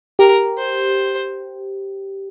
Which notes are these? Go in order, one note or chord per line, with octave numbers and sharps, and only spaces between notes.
G4 A#4
C5